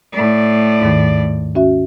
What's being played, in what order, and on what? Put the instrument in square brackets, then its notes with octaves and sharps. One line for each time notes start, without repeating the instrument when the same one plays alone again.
[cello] A2 D5
[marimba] D#2 G#2 D#3
C#4 F#4 E5